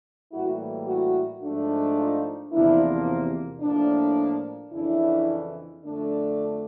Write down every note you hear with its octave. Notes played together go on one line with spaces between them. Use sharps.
A2 E3 G3 A#3 E4 F#4
E4 F#4
G#2 F3 A3 D4
D#4 F4
E2 C3 F3 A#3 D4 E4
A2 F3 A#3 D4
F2 C#3 E3 D4 E4
F2 D3 F3 A3 D4